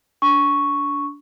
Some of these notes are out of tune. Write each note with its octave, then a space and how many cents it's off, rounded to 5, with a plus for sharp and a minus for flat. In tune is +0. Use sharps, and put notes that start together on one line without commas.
D4 -25 C#6 +0